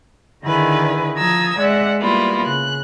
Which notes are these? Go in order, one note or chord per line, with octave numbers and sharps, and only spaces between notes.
D3 D#3 E4 G#4 B4
F3 A5 A#5 D#6 E6 G#6
G#3 D5 E5 F#5
G3 A#3 B3 E4 F4
C#3 F#6